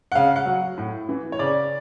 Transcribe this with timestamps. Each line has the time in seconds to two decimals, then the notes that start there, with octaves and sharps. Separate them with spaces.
0.12 F#5
0.15 C#3 F5
0.36 F#5
0.46 F#3
0.78 A2
1.09 E3
1.32 C#5
1.39 C#3 D5